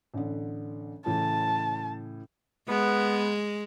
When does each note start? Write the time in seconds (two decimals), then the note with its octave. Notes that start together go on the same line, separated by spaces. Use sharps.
0.14 A1 D3
1.06 A2 C#3 E3 A5
2.69 G#3 B3